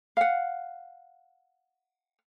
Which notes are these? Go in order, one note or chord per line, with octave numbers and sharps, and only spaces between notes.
F5 F#5